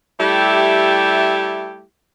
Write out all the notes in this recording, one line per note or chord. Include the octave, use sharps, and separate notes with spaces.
G3 A3 E4 G4